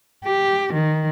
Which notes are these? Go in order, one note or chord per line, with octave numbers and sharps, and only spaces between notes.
G4
D#3